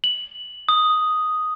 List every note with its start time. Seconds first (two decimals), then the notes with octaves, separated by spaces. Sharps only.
0.04 F#7
0.69 D#6